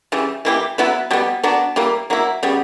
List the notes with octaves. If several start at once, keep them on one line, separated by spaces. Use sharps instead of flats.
C#3 E3 G3
E3 A#3 E4 G4
F#3 B3 E4 B4
B2 G3 B3
F#3 B3 D4
E3 G3 A#3
F#3 A#3 E4
C#3 G3 B3